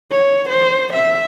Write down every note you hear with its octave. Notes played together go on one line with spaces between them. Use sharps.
C#5
C5
E5